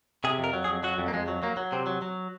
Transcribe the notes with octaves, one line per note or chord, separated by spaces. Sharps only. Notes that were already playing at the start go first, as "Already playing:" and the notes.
C3 G#4
F2
A#4
F#3
G#4
F2
F#3 F#4
F2
A#3
F2 G#3
F#3
F#3 A#3
F#3
C3 C4
F#3
F#3